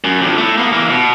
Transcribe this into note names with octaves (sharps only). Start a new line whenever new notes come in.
F#2
F2 D3
A3 E4
A#3 B3
E3 A#3
B2